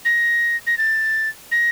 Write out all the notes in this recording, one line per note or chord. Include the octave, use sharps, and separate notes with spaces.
A#6
A#6
A6
A#6